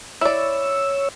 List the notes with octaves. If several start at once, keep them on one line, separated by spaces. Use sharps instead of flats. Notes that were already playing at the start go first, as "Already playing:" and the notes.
E4 C#5 D5 E6